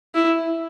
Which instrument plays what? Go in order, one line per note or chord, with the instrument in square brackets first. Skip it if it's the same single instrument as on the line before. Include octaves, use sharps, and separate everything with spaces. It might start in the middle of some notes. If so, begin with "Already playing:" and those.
[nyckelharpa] E4